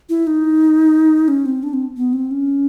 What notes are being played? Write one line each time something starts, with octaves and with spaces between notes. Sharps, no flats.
E4
D#4
C#4
C4
D4
C4
B3
C4
C#4